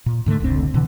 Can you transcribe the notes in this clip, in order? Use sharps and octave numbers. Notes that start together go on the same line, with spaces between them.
A#2
G#2 D3 G#3 A3
F1 C#2 D3 C4
B2 D3 E3